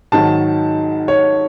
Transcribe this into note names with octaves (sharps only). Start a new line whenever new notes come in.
G#2 D#3 F#3 A5
C#5